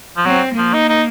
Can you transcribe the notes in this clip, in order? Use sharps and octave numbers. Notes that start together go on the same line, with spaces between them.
F3
F#3 C4
F3 A#3
D#4
D#4